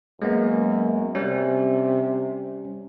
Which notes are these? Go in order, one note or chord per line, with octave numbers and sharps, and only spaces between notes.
F#2 G#3 A#3 B3
C3 G3 C#4